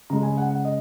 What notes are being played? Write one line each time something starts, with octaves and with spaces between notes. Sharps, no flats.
C#3 G#3 A#5
G#5
F#5
F#5
D#5